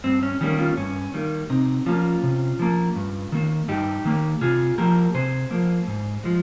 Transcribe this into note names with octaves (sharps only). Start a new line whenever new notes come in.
G2 C4
C#4
D#3 G3 A#3 C#4
C#4 F4
G2 C#4
D#3 G3 A#3
C3 C4 D#4
F3 A#3 C#4 F4
C3
F3 A#3
G2
D#3 A#3
G2 D#4 G4
D#3 A#3
C3 F4 G#4
F3 A#3 G4 A#4
C3 G#4 C5
F3 A#3
G#2
F3 G#3